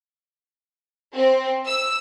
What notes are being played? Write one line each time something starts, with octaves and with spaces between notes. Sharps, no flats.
C4
E6